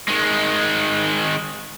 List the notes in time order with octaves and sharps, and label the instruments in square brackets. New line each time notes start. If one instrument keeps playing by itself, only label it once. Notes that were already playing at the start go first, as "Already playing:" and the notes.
[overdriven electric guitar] D#3 G#3